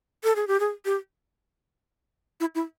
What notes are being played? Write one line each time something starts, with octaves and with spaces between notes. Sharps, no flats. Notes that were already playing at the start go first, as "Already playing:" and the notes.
A4
G#4
G4
G#4
G4
E4
E4